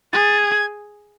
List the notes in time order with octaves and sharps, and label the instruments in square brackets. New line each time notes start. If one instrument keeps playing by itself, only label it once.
[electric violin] G#4 [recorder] A6
[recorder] G#6